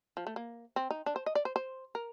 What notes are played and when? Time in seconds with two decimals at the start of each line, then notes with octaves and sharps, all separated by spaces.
0.17 F3
0.27 A3
0.36 A#3
0.76 C4
0.90 D#4
1.06 D4
1.16 C5
1.26 D#5
1.35 D5
1.45 C5
1.56 C5
1.95 A#4